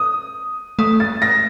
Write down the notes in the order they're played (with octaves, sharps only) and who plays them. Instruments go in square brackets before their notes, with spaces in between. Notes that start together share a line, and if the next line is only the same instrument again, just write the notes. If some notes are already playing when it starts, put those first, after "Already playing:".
Already playing: [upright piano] D#6
[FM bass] A3 [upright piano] D#6
[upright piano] A6
A#6